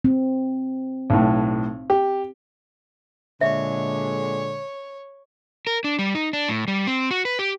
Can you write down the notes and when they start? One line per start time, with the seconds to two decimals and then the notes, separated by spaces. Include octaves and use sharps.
0.05 C4
1.10 B1 A2
1.90 G4
3.41 A#2 D3 G#3 C#5 E5
5.67 A#4
5.84 D4
5.99 G3
6.15 D#4
6.33 D4
6.49 A2
6.68 G3
6.87 C4
7.11 F#4
7.25 B4
7.39 G4